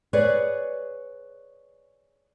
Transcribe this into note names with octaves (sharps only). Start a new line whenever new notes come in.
G#4 B4 C#5 D5